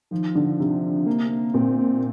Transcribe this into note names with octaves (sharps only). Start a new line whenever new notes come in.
D#3 F3
D3
C3
A#3
A#3
A#2 C4
C4